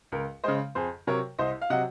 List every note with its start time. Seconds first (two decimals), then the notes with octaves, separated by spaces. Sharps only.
0.12 C#2 A#4
0.44 C#3 G#3 C5 D#5
0.75 F2 G#4 C5
1.07 C3 F#3 A#4 C#5
1.39 C2 C5 D#5
1.62 F5
1.70 C3 F#3 D#5 F#5